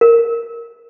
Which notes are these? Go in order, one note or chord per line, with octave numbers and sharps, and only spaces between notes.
A#4